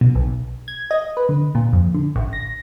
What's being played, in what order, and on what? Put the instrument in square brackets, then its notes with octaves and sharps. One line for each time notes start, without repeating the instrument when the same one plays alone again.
[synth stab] B2
B1
G#6
D#5
B4
D3
A#2
F2
D3
A1
A#6